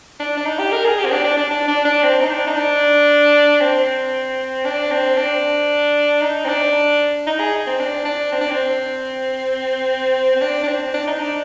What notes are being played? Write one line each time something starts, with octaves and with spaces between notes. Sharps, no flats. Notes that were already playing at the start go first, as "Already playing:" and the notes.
D4
D4
D#4
G4
A#4
G#4
G4
C4
D4
D4
D4
D4
D4
D4
C4
D#4
D4
D#4
D4
C4
D4
C4
D4
D#4
C4
D4
D#4
G#4
C4
D4
D4
C4
D4
C4
C4
D4
D4
C4
D4
D#4
D4